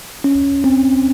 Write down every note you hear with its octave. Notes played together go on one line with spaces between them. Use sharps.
C#4
C4